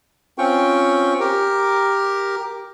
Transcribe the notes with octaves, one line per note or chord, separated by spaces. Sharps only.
C4 C#4 F4 G5 C#6
G4 A#4